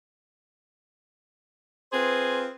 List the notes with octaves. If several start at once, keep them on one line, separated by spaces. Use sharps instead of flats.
C4 F4 G#4 B4 C5